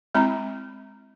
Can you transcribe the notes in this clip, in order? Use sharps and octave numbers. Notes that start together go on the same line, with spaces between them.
G#3 C4 E4 A#5 B5